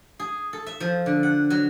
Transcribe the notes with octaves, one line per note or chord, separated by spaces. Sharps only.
G#4
A4
E5
F3
D3
F#5
F#3